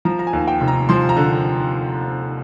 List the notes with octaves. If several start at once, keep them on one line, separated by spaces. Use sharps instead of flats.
F3 A#5
A#5
G#5
D#2
G5
F1
A#5
F3 C6
A#5
D3